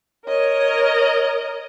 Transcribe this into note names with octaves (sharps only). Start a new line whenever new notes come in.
A#4 C#5 D#5